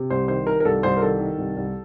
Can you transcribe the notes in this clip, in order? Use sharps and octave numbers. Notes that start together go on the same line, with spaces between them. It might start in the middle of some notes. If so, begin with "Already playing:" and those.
Already playing: C3
C2 C5
D#3 C5
D#3 A#4
A#4
C2 A4
C2 C5
A#4
D#3 A4
D#3
C2
C2